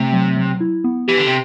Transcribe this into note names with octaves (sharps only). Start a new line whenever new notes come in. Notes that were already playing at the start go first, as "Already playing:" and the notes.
Already playing: C3 A3
F#3
F#3
E4
B3
E3 G4
D3
C3